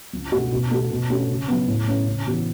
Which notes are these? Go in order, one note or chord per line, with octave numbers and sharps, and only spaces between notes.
C#2
B2 A3 F#4
B2
A3 F#4
B2
A3 C#4 F#4
C#3
F#3 B3
A2
A3 C#4
C#3
E3 B3 F#4